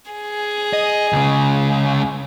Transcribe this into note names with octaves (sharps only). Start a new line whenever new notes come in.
G#4
D#5
C#2 C#3